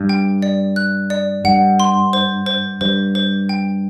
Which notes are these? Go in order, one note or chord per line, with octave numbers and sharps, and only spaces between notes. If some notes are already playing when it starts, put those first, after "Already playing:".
Already playing: G2
G5
D5
F#6
D5
G2 F#5
C6
C5
C5
G2 C5
C5
G5